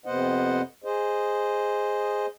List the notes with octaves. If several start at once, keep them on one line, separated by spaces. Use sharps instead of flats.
F2 C3 B3 C5 D#5 F#5
G#4 C5 D#5